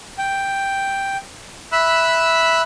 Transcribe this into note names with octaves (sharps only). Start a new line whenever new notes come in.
G5
E5 B5 E6 F#6